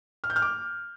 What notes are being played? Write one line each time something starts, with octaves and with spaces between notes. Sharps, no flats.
F6
G6
F6
D6